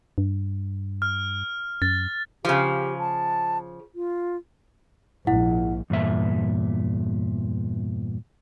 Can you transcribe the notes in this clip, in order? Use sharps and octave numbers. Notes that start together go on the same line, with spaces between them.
G2
F6
F#2 A6
C#3 F3 G4
A5
F4
A#1 G#2 E4 F#5
E2 G2 A#2 E5